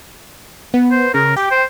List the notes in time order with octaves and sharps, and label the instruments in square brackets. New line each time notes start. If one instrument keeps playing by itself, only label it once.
[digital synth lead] B3
[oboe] C5
[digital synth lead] C#3 [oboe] A#4
[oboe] G4 [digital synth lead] G5
[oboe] C5